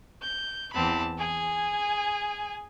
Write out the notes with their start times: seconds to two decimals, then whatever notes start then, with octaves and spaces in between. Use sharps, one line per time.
0.21 G6
0.73 E2 E3 C4 A5 B5
1.17 G#4 G#5